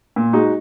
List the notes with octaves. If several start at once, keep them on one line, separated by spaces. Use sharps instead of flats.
A#2
G#3 D#4 F#4